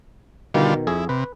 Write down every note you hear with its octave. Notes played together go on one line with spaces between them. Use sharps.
B2 D3 D#3 G3 F4
F2 E4 G#4
C3 B4